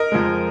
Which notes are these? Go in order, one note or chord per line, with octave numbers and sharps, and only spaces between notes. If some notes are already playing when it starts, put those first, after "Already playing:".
Already playing: A#4 D#5
F2 F3 G#3